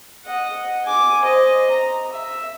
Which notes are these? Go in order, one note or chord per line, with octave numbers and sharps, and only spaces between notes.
D#5 F#5
G#5 D6
C5 D#5
A#5
E5